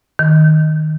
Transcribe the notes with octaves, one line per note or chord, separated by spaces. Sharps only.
D#3